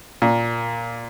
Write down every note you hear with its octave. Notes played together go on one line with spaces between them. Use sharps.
A#2